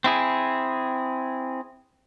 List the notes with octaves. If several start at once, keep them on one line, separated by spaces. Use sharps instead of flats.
C4 E4 G#4